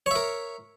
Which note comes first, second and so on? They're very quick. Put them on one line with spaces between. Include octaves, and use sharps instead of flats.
C#5 E5 A#4